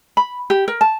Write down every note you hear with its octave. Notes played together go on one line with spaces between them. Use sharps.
B5
G4
A#4
A5